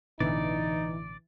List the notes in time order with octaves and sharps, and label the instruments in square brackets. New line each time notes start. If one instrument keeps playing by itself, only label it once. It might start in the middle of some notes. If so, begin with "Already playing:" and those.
[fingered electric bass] A1 B2 D3 [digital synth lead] E3 [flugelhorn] D#4 [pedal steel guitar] D5